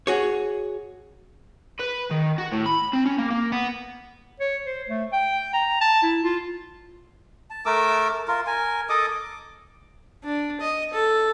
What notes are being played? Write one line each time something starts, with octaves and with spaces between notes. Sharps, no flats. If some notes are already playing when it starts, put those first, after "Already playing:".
F#4 G#4 C#5
B4
D#3
F#4
A2
B5
C4
C#4
A#3
A#3
B3
C#5
C5
A3
G5
A#5
A5
E4
F4
A5
A3 A#4 D6 E6
F4 A#4
A#4 G#5
A4 D#5 D6 D#6
D6
D4
D#5
A4